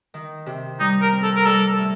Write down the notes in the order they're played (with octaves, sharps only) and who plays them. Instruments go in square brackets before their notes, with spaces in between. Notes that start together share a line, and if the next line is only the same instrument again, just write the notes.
[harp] D#3
C3
[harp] G3 [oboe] D#4
[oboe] A#4
[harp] C4
[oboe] A4
A#4
[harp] G3 [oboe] A4
[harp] A2